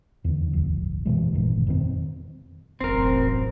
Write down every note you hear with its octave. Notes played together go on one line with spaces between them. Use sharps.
E2 D3
D1 G1 F3
F#2 B2 E3 G#3
G1 A#2 D#3
F2 D#3 G3 C4
E1 A1 F#2 C4 A#4